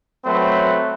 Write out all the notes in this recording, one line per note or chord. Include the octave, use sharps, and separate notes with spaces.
F#3 A3 C4 B4